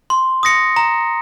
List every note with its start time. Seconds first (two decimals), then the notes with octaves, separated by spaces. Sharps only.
0.10 C6
0.43 D#6 A#6 C#7
0.76 A#5